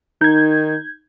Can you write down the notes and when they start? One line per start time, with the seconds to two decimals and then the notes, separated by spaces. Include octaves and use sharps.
0.21 D#3 D#4 G6 G#6